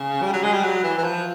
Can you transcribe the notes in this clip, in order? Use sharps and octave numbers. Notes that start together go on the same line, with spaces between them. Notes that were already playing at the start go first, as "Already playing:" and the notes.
Already playing: C#3
G3
F#3
G#3
G3
F#3
E3
E3
F3